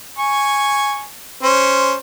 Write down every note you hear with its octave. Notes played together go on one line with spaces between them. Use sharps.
G#5 C#6
C#4 C5